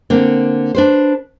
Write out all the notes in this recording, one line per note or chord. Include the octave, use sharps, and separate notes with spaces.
D3 A#3 C4
D4 B4 C5